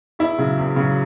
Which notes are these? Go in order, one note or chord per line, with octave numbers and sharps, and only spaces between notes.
E2 E4
C#3 F#3
E2
C#3 F#3